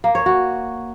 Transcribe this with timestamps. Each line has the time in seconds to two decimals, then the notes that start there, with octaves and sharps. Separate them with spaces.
0.04 A#3
0.15 C#5
0.26 F#4